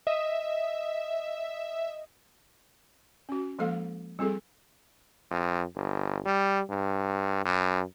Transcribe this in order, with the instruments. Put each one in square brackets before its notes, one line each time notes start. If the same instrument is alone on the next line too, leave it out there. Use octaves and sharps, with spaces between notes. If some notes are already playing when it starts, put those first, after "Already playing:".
[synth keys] D#5 [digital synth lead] E5
[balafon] C#4 F#4
F3 G#3 A#3 A4 F5
G3 C4 F4 G#4 A4
[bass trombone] F2
G1
G3
G2
F#2